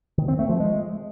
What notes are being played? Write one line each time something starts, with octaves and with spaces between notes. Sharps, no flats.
D#3
C4
A3
F3
G#3